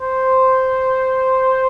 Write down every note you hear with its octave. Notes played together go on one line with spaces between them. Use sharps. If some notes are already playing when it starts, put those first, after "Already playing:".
C5